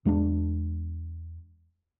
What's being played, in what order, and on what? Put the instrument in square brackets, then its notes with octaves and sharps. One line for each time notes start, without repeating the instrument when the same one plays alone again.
[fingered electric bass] E2 G#3 C4 D4